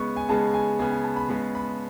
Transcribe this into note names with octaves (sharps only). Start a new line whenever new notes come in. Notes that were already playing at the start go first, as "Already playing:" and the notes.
Already playing: C#3 G#3 B3 C#6
G#5
C#3 G#3 B3 A5
G#5
C#3 G#3 B3 G#5
G#5
A5
B5
C#3 G#3 B3 B5
B5